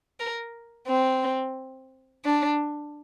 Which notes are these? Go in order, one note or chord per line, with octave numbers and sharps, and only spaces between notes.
A#4
C4
D4